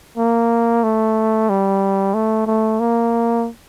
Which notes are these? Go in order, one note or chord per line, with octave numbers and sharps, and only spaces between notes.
A#3
A3
G3
A3
A3
A#3